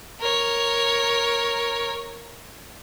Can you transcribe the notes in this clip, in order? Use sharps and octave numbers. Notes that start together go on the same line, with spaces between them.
A#4 C#5